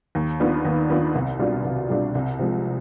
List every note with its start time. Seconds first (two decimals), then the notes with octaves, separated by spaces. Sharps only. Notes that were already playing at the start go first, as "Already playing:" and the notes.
0.15 D#2
0.40 D#3 B3 D4 F4
0.65 D#2
0.90 D#3 B3 D4 F4
1.15 C2
1.39 B2 G3 D4 F4
1.65 C2
1.90 B2 G3 D4 F4
2.15 C2
2.39 C3 F3 G#3